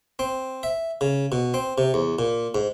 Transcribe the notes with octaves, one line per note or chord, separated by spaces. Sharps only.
C4
E5
C#3
B2
C4
C3
E2
A#2
G#2